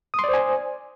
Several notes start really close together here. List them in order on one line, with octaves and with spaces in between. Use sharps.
D#6 C6 D5 C5 G#5